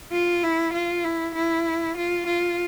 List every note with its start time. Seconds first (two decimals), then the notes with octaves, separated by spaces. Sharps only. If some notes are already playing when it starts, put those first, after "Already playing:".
0.12 F4
0.43 E4
0.73 F4
1.04 E4
1.35 E4
1.97 F4
2.26 F4